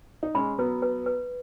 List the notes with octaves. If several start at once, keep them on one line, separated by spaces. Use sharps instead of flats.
D#4
G#3 C#4 B5
F#3 B3 B4
B4
B4